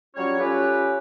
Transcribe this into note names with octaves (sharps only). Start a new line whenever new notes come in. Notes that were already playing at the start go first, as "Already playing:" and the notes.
F#3 G3 C#4 F4 C#5
C#4 F4 G4 A4 B4